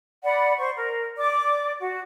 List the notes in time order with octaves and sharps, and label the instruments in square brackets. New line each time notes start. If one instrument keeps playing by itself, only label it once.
[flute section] D5 F#5 B5
C5 C#6
A#4
D5 D6
F#4